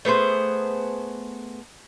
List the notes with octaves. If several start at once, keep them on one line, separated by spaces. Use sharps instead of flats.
A3 B3 G#4 C5